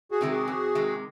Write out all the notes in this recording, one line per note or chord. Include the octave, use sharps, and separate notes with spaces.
F#4 G#4
C3 D#3 G#3
F#4 G#4
F2
C3 D#3 G#3